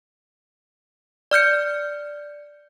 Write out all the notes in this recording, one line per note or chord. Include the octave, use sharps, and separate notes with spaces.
D5 F6 G6 C#7